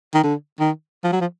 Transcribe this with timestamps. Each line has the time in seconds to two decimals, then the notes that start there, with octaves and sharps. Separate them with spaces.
0.14 D#3
0.24 D3
0.60 D#3
1.04 F3
1.13 F#3
1.21 F3